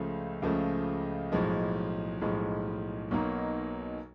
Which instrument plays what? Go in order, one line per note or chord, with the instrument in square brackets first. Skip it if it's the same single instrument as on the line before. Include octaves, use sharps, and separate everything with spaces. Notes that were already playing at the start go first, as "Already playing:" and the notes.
Already playing: [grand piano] C#2 C#3 F3 A3
C#2 C#3 F3 A3
B1 A2 F3 G#3
B1 A2 F3 G#3
B1 B2 F#3 A#3 D#4